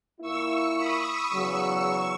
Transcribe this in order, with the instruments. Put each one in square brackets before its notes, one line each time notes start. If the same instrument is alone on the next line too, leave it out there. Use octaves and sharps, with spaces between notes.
[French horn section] A#2 A#3 E4 [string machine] C#6 E6
[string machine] B5 D#6
[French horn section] E2 C#3 F#3 [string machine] C#6 E6